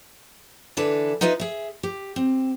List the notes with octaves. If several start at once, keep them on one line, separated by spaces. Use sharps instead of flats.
D3 E3 D4 A4 B4
D#4 F4 B4 D#5 E5
G#4 E5
G4
C4